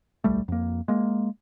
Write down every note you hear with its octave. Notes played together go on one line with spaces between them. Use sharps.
D1 B1 G3 A3
F2 A#3
G#3 A#3